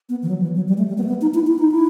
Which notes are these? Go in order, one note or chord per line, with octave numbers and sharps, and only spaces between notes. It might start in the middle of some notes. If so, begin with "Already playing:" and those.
B3
E3
F#3
E3
F#3
G3
A3
G3
B3
A3
B3
D#4
E4
E4
D#4
E4